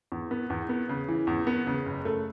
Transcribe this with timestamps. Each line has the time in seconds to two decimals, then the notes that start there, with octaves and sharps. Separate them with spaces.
0.12 E2
0.31 B3
0.50 E2
0.69 B3
0.89 C#3
1.08 E3
1.27 E2
1.47 B3
1.67 C#3
1.86 F#1
2.05 A3